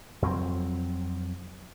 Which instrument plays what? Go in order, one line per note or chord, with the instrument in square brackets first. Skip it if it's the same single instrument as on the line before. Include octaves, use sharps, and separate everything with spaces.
[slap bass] F2 F#3 A#3 C4